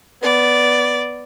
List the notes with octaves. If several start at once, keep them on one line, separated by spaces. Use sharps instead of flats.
B3 D5